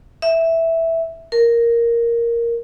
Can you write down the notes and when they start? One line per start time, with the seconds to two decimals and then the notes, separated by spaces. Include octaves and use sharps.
0.22 E5
1.32 A#4